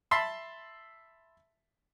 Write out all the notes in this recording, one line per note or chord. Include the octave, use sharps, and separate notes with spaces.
E5 A5 B5 C6 E6